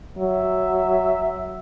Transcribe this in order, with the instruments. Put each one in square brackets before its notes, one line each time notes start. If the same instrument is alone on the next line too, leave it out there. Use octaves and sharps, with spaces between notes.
[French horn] F#3 [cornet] E5